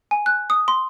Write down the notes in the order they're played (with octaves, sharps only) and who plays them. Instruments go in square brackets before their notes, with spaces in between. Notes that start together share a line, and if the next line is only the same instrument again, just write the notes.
[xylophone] G#5
F#6
D#6
C6